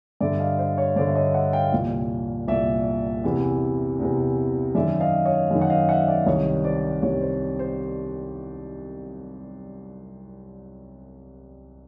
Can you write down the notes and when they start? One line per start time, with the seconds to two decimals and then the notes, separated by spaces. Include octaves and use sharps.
0.20 G2 D3 D5 E5
0.40 D#5 F5
0.58 C5
0.78 C#5
0.96 G2 D3 C5 D5
1.07 E5
1.15 C#5 D#5
1.34 E5 F#5
1.53 F5 G5
1.72 C2 A#2
2.48 C2 A#2 D5 E5
3.24 E2 C3 E3
3.99 E2 C3 E3
4.75 F#2 D#3 D5 E5
5.00 D#5 F5
5.26 C#5 D#5
5.51 F#2 D#3
5.62 F#5
5.70 D#5 F5
5.89 E5 F#5
6.03 D#5
6.08 D5 E5
6.26 C2 C3 D#3 C#5 D#5
6.64 C5 D5
7.02 C2 C3 D#3 C#5
7.21 C5
7.59 C5